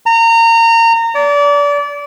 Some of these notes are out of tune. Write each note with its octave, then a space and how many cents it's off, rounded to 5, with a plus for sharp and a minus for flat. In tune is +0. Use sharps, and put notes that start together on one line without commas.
A#5 -25
D5 -30